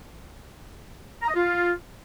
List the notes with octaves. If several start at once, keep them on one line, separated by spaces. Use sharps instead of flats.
A#5
D#5
F4